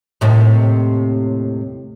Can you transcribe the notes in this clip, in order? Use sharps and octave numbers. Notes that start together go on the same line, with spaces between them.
D#2 A2 C3